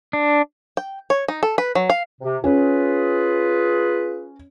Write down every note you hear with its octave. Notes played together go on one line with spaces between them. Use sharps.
D4
G5
C#5
D#4
A4
B4
F#3
F5
C3
C#4 F4 G#4 B4